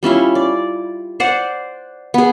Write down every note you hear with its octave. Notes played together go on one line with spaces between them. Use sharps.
G3 C#4 E4 F4
D5
C5 D5 F#5
B3 G#4